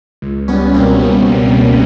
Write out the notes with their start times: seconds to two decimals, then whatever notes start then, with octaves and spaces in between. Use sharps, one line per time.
0.22 C#2
0.48 G3 B3 C#4
0.74 B2 A#3 C4
1.00 G3
1.26 C#2
1.52 B2